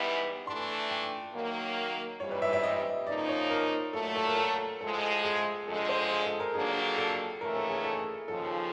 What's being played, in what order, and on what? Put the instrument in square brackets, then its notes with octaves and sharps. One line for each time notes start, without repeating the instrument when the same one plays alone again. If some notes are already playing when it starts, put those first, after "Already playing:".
Already playing: [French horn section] G#2 E3 G3 B3 E4
[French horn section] E3 A3 D4 [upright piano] C6
[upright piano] G5
[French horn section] D#3 F#3 A#3
[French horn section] G#2 E3 G3 C4 [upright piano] C#5
[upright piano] B4
E5
E5
D#5
[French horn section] C#3 F3 A#3 D#4 [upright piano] D5
[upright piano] C#5
A#4
[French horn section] A#2 F#3 A3 [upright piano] A4
[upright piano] A4
A#4
A4
[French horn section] A2 F3 G#3 [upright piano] A4
[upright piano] G#4
[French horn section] F2 D3 F3 G#3 [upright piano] A4
[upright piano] C5
G#4
A4
A#4
[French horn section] F2 D3 F#3 A#3 D4 [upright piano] G#4
[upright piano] A4
[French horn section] D#2 C#3 E3 A3 C#4 [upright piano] A#4
[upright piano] A4
G#4
A4
[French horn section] D#2 C#3 F3 [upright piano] A4